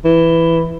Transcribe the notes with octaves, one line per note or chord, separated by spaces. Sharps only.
E3